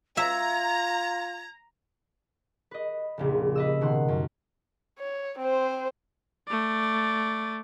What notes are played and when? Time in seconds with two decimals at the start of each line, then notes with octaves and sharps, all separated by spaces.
0.17 F4 E5 A#5 G#6
2.71 B4 D#5
3.18 F1 A#1 C#3
3.55 B4 D#5 E6
3.81 B2 D#3 F#5 C6
4.08 F#2
4.99 C#5
5.39 C4 C5
6.48 A3 D5